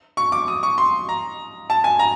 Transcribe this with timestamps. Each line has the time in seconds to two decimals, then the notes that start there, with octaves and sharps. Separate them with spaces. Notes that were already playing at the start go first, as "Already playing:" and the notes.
0.17 C#6
0.32 D6
0.48 D#6
0.63 C#6
0.78 C6
1.09 A#5
1.70 A5
1.84 G#5
1.99 A#5